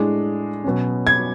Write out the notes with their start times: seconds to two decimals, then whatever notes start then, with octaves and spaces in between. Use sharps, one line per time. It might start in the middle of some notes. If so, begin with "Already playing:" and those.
Already playing: A2 G#3 D4
0.64 B2 F#3 C#4
1.07 G#6